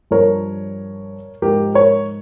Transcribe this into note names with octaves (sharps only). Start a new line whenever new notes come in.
G2 F3 A#4 C#5
G#2 F3 G4 A#4
A#4 C#5